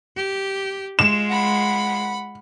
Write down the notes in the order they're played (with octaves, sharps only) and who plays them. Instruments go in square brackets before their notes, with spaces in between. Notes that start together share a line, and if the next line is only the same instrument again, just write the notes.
[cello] G4
[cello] G#3 F4 [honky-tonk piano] E7
[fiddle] F#5 B5